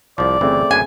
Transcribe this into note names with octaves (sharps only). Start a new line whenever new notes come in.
C2 F3 D5
G1 C#3 E3 A3 C4
F#2 B3 D4 G#5